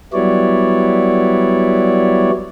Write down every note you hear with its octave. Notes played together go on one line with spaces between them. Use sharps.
F#3 G3 B3 E4 C#5 D5